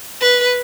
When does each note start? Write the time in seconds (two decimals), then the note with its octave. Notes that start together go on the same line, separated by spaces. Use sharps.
0.21 B4